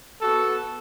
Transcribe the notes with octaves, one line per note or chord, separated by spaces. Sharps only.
B3 F#4 A4